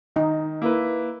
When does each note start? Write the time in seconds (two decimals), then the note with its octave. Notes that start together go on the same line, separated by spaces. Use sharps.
0.16 D#3 D#4
0.62 A#3 E4 B4